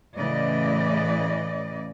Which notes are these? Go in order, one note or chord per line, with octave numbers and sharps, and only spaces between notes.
A2 C#3 E3 D5 D#5